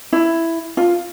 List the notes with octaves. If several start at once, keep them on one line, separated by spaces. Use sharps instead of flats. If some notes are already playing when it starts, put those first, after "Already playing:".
E4
F4